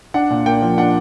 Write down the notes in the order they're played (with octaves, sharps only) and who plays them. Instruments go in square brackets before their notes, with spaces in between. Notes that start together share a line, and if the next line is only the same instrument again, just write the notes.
[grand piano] D4 F#5
A#2
A#3 G5
F3
D4 F#5